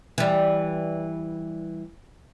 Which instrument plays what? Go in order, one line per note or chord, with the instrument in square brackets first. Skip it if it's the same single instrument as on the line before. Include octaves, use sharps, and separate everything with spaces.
[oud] E3 G3